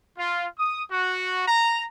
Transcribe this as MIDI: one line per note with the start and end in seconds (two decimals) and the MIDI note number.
0.17 0.46 65
0.58 0.84 87
0.90 1.46 66
1.48 1.83 82